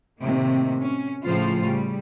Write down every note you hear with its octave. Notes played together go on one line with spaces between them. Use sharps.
A2 C3 D#3 A#3
C#4
A2 C#3 F3 F4 C5 F5
C#3 G3